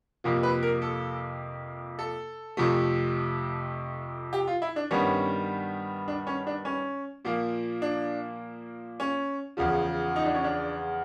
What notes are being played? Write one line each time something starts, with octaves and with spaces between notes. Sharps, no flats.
F2 C3 F3 A#3
B4
A#4
A4
A4
F2 C3 F3 A3
G4
F4
E4
D4
G2 D#3 G3 B3 C#4
D4
C#4
D4
C#4
A#2 F3 A#3
D4
C#4
E2 C#3 F3
D#4
D4
C#4
D4